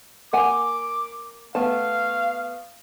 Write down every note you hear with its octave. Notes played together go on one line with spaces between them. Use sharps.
A#3 F#5 G#5 D6
A3 B3 F5 A5